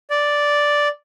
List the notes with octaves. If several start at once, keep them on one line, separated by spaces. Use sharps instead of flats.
D5